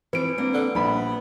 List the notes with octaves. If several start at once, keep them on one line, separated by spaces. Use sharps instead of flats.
E3 F3 C4 B4 D7
A#3 C4 D4
D3
A#1 G3 B3 B5